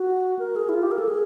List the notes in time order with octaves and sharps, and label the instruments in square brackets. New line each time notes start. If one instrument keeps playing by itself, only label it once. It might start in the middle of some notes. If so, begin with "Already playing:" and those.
Already playing: [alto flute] F#4
A#4
G#4
E4
F4
G4
A#4
A4
G#4